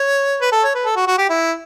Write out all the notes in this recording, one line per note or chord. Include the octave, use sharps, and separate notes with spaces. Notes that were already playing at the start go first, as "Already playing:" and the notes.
Already playing: C#5
B4
A4
C#5
B4
A4
F#4
F#4
G4
E4